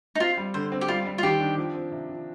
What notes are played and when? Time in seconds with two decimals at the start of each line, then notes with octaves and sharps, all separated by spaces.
0.15 D#4
0.20 C4 F4
0.37 G3
0.54 D3 C5
0.72 C4
0.81 G4
0.88 G3 F4
1.06 G3
1.18 F4
1.23 D#3 G4
1.40 D4
1.57 F3
1.74 C4
1.92 C3
2.09 F3